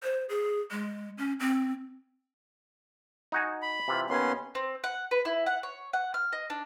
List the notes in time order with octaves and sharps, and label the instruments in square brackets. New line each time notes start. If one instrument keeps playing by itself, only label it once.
[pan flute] C5
G#4
G#3
C#4
C4
[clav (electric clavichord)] D#4 F#4 G#5
[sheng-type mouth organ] B5
[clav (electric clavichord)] C3 E3 F4
[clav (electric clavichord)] D#2 G#5 [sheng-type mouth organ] B3 C#4 C6
[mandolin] C4
F#5
B4
E4
F#5
C#5
F#5
F6
D#5
D4